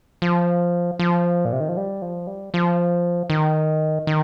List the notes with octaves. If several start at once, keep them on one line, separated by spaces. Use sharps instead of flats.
F3
F3
A#2
C3
D#3
F3
G3
F3
G3
F3
D#3
D#3